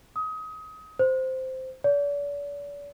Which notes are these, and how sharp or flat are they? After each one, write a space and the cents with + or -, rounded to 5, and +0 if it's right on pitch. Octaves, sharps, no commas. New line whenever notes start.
D#6 +25
C5 -5
D5 -40